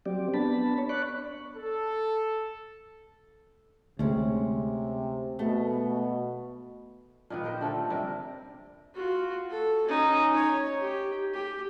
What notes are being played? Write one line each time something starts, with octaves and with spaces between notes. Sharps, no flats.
F#3 C4 G4 D5
B3 D4 A5 B5
C#5
D5 B5 C#6 F#6
A4
D2 C3 G#3 C#4
B2 A3
A#2 D#3 B3
G4 A#4 C5
D3 A3 C4 A4
C3 G3 A#4
F4 F#4
A4
C#4 D#4
C#5
G4
G4